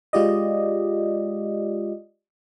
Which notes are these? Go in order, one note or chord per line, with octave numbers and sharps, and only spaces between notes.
G#3 F4 G4 D5 D#5